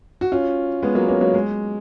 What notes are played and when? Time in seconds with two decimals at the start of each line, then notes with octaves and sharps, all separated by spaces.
0.21 F#4
0.32 C#4 F4
0.83 G#3 B3
0.95 F#3 A#3
1.08 A#3 C#4
1.21 F#3 A#3
1.34 G#3